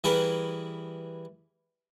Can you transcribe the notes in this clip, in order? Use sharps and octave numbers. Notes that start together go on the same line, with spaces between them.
E3 G3 E4 G#4 A#4 B4